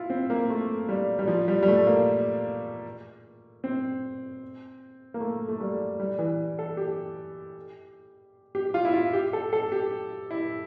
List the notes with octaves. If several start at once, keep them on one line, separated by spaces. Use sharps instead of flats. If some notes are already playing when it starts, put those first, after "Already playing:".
Already playing: E4 F4
C4
A#3
A3
G3
G3
F3
G3
G3
A3
A#3
C4
A#3
A3
A3
G3
G3
E3
A4
G4
G4
F4
E4
F4
G4
A4
A4
G4
E4